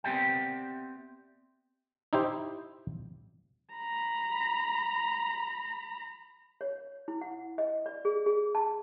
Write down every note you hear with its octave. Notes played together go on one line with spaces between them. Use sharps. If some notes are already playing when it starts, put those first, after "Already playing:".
B3 C4 G4 D5 E5 G5
D#4 E4 G4 C5
A#5 B5
C#5
E4
F#5
D#5
D5
G#4
G#4
A5